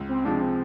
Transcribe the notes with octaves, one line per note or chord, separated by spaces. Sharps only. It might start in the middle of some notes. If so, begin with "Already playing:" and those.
Already playing: C#2
C4
C3 F3 G#3 D4
C4